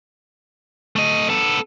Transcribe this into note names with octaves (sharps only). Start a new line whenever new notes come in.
A3 D#5
B3 A4